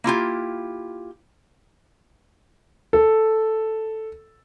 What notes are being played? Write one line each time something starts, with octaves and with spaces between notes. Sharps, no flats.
A#3 E4 F4 G4
A4